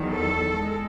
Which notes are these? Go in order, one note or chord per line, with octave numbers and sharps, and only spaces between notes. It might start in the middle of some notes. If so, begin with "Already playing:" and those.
Already playing: E2 D#3 F#3
A4
G#3